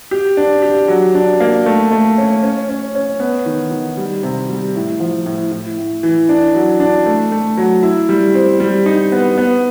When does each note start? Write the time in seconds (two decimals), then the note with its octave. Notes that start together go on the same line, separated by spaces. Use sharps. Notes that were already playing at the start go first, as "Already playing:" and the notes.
0.11 G4
0.37 D4
0.62 G4
0.88 F#3
1.15 D4
1.41 A#3
1.66 A3
1.91 A3
2.18 C#4
2.43 C#4
2.69 C#4
2.95 C#4
3.20 B3
3.46 D#3
3.71 D#3
3.97 G3
4.23 C3
4.49 G3
4.75 A2
5.00 F3
5.26 A2
5.52 A2
5.78 A2
6.03 E3
6.29 D4
6.55 F#3
6.80 D4
7.06 A3
7.32 A3
7.57 F#3
7.83 E4
8.09 G3
8.34 C4
8.60 G3
8.86 D#4
9.12 B3
9.38 B3